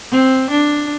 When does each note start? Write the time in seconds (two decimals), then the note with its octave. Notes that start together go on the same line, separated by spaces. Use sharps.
0.11 C4
0.51 D4